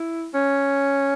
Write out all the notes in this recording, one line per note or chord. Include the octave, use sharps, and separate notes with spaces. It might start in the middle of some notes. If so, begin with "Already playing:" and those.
Already playing: E4
C#4